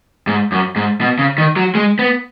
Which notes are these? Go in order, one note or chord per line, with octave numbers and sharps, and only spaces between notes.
G#2
F#2
G#2
B2
C#3
D#3
F#3
G#3
B3